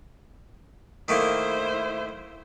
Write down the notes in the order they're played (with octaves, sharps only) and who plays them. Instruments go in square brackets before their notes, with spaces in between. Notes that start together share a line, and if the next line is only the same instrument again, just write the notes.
[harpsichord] D#3 A3 A#3 [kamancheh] E4 C5